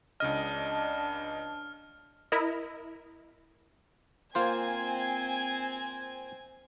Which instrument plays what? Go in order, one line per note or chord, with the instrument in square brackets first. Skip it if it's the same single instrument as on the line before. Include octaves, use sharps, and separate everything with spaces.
[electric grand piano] C#2 C#3 D#5 [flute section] D4 A5 [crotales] F6
[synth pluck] E4 A#4 D#5
[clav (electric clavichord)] A#3 F4 C5 [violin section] C4 G#5 G#6